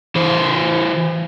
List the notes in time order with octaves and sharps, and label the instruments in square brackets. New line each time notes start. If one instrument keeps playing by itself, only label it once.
[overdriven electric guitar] E3 C5